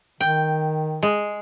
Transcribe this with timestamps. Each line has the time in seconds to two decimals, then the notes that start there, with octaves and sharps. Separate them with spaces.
0.21 D#3 G5
1.03 G#3